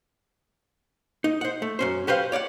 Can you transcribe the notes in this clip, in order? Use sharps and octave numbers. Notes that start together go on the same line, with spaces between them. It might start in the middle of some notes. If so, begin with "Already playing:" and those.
D#4
C5 F#5
A3
F#2 C#4 C5
F#4 G4 B4 C5 F5
C#5 D5 F5 F#5